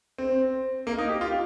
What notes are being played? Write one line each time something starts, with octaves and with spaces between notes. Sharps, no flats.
C4
A#3
D#4
G4
F4